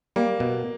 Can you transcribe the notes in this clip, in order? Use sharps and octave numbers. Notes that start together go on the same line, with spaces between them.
G3 A#3
B2